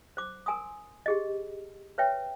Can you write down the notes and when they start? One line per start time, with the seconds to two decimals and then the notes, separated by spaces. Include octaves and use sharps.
0.17 C5 D6
0.46 A#4 G#5 C6 D#6
1.06 G4 G#4 D#5
1.98 B4 C#5 E5 G5